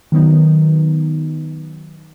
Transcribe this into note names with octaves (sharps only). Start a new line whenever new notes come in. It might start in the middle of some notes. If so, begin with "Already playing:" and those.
D#3 F#3 B3 D#4